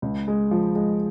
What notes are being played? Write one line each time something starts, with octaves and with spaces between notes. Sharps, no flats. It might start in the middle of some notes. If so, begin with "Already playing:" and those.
C#2
G#3
F3
G#3